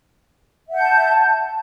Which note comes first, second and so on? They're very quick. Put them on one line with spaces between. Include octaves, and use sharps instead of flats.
E5 F#5 G6 A5